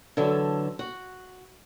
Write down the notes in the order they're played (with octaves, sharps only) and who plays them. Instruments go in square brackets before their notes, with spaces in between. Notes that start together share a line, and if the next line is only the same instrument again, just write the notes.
[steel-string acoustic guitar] D3 E3 F#3 A4
F#4